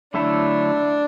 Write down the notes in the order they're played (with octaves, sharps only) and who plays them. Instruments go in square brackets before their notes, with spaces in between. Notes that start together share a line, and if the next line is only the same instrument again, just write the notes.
[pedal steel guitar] D3 F#3 A3 E4 A4 [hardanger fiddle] D4